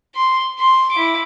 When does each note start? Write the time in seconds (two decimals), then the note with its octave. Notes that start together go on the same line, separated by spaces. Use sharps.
0.16 C6
0.59 C6
0.92 E4 D6